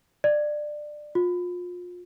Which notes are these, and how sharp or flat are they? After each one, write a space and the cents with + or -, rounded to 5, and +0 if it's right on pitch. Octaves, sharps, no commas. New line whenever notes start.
D5 +20
F4 +30